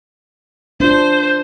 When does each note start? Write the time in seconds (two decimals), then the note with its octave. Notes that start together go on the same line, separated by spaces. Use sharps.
0.80 D4 F4 C5